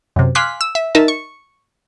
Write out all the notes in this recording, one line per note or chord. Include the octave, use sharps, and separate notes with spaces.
F#2 C3
F5 G#5 C6 D6 F#6 B6
E6
E5
D#4 A#4 D#5 E5 A5
C#6